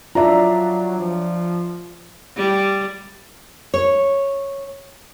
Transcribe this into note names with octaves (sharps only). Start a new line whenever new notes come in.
F#3 D4 F4 D5 E5 A#5
F3
G3
C#5